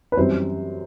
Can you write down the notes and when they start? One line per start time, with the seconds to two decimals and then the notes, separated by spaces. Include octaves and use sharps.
0.12 B4
0.17 F#2 E3 G3 C4 C5